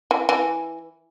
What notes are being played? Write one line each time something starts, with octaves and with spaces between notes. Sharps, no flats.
E3
E3